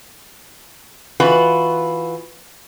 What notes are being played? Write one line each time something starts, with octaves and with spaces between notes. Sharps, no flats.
E3 F4 F#4 B4